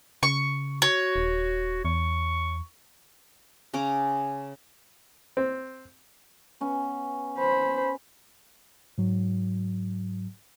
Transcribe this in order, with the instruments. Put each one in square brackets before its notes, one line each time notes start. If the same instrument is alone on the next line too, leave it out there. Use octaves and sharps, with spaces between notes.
[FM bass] C#3 [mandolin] C#6
[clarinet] F#4 [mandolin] C#5
[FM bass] D#1
[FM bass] E2 [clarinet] C#6
[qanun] C#3 C#4 A#5 D6
[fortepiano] C4
[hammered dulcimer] B3 C#4
[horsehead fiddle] C5 B5
[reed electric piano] G#2 F#3